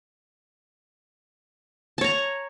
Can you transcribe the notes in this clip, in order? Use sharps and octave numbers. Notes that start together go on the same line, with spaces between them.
C#5 A5 A#5